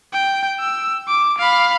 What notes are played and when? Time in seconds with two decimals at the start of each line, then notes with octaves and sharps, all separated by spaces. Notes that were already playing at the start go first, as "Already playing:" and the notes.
0.13 G5
0.60 E6
1.08 D6
1.38 F5 B5